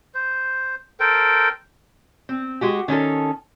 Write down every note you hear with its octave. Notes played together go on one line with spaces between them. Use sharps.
C5
A4 A#4 C5 G5
C4
G#3 F#4 G4
D#3 C#4 D#4 A4